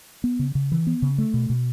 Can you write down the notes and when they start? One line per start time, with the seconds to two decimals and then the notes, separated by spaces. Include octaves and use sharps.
0.24 B3
0.39 C#3
0.55 C#3
0.72 E3
0.87 B3
1.02 C#3
1.18 A3
1.34 B2
1.50 B2